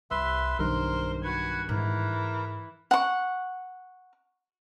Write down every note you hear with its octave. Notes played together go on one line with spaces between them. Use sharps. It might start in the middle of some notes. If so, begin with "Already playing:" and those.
C2 B4 E5 C6
B1 G2 D#3 F#3 A#4 C5 C6
F#4 B4 G#5
G#2 E3 A#4
F#5 C#6